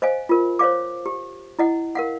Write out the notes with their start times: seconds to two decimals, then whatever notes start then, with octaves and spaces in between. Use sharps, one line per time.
0.02 C5 D#5 F5 G#5
0.29 F4 A#4
0.59 C5 C#5 F5 D6
1.06 G4
1.59 E4 D#5 F#5
1.95 A#4 F5 F#5